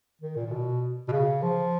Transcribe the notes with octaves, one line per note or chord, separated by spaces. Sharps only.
D#3
A#2
A#2
B2
B2
C#3
F3